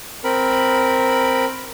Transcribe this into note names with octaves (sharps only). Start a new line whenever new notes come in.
C4 A#4 B5